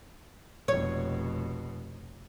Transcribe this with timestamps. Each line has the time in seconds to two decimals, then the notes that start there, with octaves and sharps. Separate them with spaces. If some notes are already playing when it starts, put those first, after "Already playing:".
0.68 F1 B2 C#5